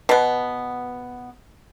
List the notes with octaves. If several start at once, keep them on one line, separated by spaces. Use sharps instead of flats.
B2 B3